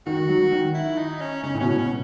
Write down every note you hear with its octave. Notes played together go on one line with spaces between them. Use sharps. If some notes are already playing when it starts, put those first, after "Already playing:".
D#3 F#4
F#3
D#3
E4
D#4
C#4
C#3 C#4
A2
B2 C#4
C#3 C#4